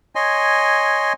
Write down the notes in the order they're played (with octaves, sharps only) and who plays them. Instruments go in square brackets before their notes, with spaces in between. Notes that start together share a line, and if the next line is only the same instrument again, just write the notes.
[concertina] C#5 D#5 G#5 C6